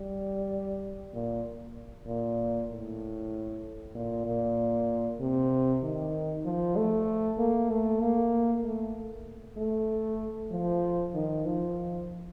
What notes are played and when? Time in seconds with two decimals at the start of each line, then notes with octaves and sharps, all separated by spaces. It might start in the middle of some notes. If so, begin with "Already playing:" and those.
Already playing: G3
1.14 A#2
2.07 A#2
2.69 A2
3.95 A#2
4.26 A#2
5.20 C3
5.83 D#3
6.45 F3
6.76 A3
7.38 A#3
7.70 A3
8.01 A#3
8.64 A3
9.57 A3
10.51 F3
11.14 D#3
11.46 F3